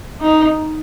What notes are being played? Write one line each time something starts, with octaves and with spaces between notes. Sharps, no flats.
D#4